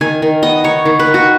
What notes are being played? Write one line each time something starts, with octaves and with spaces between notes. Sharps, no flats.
D#3 G#5
D#3
B3 D#5
D#4 C#5
D#3
B4
D#3
F#4